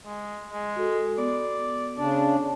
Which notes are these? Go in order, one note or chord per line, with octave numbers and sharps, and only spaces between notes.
G#3
G#3
F#4 A4
B3 D5
C#3 D4 D5